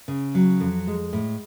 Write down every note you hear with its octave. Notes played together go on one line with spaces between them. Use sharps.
C#3
F#3
F2
G#3
A2